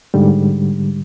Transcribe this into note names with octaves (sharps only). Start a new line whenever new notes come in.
G#2 D3 G3